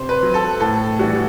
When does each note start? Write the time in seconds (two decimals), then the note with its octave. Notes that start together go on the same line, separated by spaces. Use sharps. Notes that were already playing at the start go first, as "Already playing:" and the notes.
Already playing: C3 C5
0.09 B4
0.22 F#3
0.34 A4
0.60 A2 A4
0.99 E3 G3 F#4